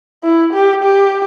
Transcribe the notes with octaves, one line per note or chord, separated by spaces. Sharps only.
E4
G4
G4